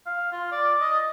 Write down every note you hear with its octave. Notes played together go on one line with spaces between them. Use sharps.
F5
F4
D5
D#5